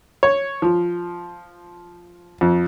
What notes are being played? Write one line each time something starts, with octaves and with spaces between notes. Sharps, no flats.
C#5
F3
F2